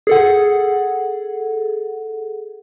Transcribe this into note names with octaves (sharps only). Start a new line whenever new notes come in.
G#4 A4 F#5